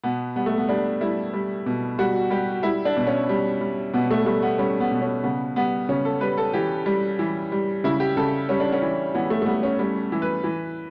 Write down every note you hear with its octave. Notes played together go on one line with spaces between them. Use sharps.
B2 B3
G3 B3
A3
B3
G3 D4
G3 E4
G3
B2
G3 F#4
G3 G4
G3 E4
D4
B2
C#4
G3
G3
B2 B3
A3
G3 A3
B3
G3 C#4
B3
B2
C#4
C#3 B3
G3 B3
C#3 C#4
A4
G3 B4
A4
E3 G4
G3
E3
G3
C#3 E4
G4
C#3 A4
G3 C#4
D4
C#4
E3
E3 B3
A3
A3
G3 B3
C#4
G3 C#4
E3
B4
E3